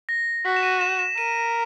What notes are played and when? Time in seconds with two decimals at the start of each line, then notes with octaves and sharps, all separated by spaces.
0.09 A#6
0.45 F#4 B6
0.56 E7
0.63 D#7
0.81 E7
0.99 E7
1.17 A#4 D#7